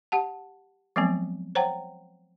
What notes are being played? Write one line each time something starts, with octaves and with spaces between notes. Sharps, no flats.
G4 F#5 A5
F3 F#3 G#3 B3 C4
C5 C#5 F#5 G5 A#5